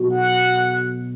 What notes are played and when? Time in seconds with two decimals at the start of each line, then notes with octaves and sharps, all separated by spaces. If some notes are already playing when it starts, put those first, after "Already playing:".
Already playing: B1 B2 F#3
0.12 F#5